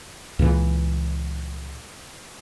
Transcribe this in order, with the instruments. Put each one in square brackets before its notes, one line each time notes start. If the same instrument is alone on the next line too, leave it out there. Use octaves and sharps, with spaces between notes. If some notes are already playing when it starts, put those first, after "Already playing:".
[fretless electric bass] C#2 A#2 E3